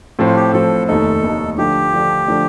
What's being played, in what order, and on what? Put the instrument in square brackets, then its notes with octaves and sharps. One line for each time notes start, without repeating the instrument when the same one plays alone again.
[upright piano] A2 F3 C4
[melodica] F4
G4
[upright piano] A2 F3 C4 [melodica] A4
[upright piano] F1 D#2 D#3 A3 D#4 [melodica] A4
[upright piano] F1 D#2 D#3 A3 D#4
[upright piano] D3 F3 A3 D4 [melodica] G4
[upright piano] D3 F3 A3 D4
D3 F3 A3 D4